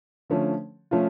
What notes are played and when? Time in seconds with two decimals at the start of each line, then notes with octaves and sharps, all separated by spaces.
0.30 D3 F3 A3 C#4
0.91 F3 A3 C#4 F4